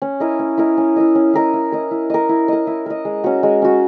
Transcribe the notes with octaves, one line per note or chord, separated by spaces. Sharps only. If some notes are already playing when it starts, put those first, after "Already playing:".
C#4
E4 A#4 D#5
C#4
E4 A#4 D#5
C#4
E4 A#4 D#5
C#4
E4 A#4 D#5
E4
A#4 D#5
E4
A#4 D#5
E4
A#4 D#5
E4
A#4 D#5
G#3
C#4 F#4
G#3
C#4 F#4